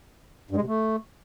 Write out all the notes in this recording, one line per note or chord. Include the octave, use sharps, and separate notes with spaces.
G2
G#3
C3
A3